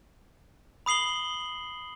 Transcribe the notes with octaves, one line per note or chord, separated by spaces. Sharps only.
B5 D#6 C7 F#7 G7